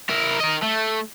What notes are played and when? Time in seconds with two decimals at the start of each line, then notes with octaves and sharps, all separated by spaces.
0.09 E4 A#4
0.41 A#4 D#5
0.63 A3